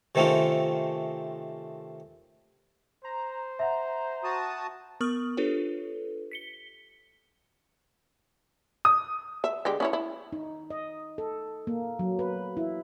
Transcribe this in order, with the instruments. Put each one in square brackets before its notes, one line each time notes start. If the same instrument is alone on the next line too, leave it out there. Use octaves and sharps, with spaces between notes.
[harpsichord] C3 D#3 A3 C4 C#4 F4
[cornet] C5 [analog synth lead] A#5
[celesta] E5 F#5 [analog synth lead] A#5
[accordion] F#4 A5 D#6
[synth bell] B3 A#4 C#6 D#6 F6 F#7
D4 F4 G4 A4 B4 C#5
B6 C#7 G7
[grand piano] D#6
[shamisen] E5
D3 G#3 G4
C#4 E4 C#5
E4
[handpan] D#4
D#5
A4
A#3
F#3
B4
E4